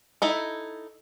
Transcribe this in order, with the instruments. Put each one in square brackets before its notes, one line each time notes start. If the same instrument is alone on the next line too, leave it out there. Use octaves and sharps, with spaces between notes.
[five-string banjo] D#4 E4 A4